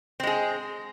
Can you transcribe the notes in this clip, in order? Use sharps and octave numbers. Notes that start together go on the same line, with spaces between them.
G#3 C4 G#4